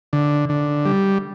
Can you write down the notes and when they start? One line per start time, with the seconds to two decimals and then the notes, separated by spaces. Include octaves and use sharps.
0.13 D3
0.49 D3
0.85 G3